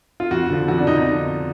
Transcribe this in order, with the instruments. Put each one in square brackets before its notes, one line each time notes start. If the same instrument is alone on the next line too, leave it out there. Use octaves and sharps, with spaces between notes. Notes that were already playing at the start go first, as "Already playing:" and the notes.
[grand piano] F4
F2 F#4
D3 F3
F2 F#4
D4
D3 F3 D#4
D#4